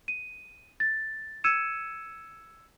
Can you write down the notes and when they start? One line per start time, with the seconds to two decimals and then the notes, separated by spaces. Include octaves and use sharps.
0.08 D#7
0.80 A6
1.44 E6 G#6 C#7 D#7 E7